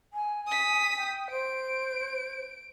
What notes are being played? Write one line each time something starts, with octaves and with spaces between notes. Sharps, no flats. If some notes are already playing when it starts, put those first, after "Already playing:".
G#5
D#6 B6
G5
C5 D7